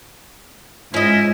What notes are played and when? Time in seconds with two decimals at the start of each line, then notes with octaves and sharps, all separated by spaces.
0.94 G#2 C#4 E4 F4 D#5